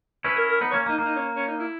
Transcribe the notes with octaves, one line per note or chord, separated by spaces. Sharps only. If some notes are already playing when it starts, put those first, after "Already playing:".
C#4 E4 B4
A#4
A#4
B3 D#4 B4
A#3 C#4 C#5
A#3 D#4
A#3
D#4
C#4
C#4
D#4
E4